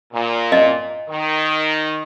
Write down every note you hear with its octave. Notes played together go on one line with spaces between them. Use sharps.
A#2
D#5
D#3